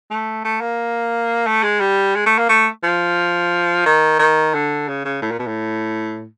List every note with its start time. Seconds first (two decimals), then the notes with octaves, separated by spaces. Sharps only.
0.11 A3
0.44 A3
0.61 A#3
1.47 A3
1.63 G#3
1.80 G3
2.15 G#3
2.26 A3
2.38 A#3
2.49 A3
2.83 F3
3.86 D#3
4.19 D#3
4.54 D3
4.88 C#3
5.05 C#3
5.22 A2
5.31 A#2
5.39 B2
5.47 A2